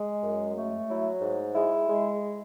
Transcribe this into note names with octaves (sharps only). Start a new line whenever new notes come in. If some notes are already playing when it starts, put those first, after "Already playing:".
Already playing: G#3
F#2
A3
F#3 E4
G#2
G#3 E4
G#3